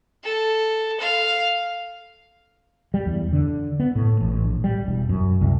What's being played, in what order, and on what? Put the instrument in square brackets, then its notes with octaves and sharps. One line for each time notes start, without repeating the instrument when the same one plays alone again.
[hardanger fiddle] A4
F5
[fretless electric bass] G3
E2
D3
B3
A2
A1
A#1
G3
E1
F#2
C2